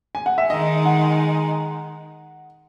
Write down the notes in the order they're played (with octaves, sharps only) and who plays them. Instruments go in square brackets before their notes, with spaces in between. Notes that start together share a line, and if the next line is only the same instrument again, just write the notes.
[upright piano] G#5
F#5
E5
[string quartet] D#3 G#3 D#4 [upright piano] D#5
[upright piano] F#5